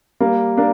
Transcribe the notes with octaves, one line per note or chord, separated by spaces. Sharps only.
G3 A#3
A#3 D4